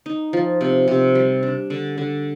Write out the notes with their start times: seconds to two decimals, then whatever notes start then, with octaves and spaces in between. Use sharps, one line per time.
0.06 D#4
0.33 F3
0.61 C3
0.88 C3
1.15 G3
1.43 D4
1.70 D3
1.98 D3